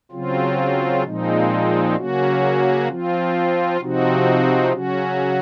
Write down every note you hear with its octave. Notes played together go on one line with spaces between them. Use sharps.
C#3 F#3 C4 F4
A#2 F3 G#3 C4 D#4
C#3 F#3 A#3 C#4 F#4
F3 C4 F4
C3 F3 C4 D#4 F#4
C#3 F#3 C#4 F#4